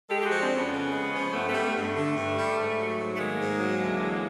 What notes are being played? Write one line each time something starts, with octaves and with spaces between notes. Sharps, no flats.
G#3 G4 A4
G4
F3 F#4 G#4
C4 D4
F2 B3 C#4
C#3
G#3
F3
G2 A3 B3
G3 A3 B3
A3
G2 A3
D3
G2
G3
G#2
F#3
G#2
A3
D#3 G#3 A#3
G#2
F#3
D2
E3